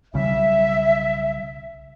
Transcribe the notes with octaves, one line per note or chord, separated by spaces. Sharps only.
B1 C#3 G3 E5